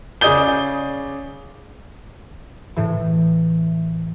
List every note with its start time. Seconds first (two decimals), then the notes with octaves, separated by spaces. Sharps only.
0.21 C#3 G#4 D5 D#6 G6 G7
2.76 A2 E3